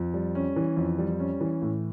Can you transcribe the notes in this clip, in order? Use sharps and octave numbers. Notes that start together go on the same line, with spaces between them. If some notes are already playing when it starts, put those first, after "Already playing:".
Already playing: F2
G3
C#4
E3
F2
G3
C#4
E3
A2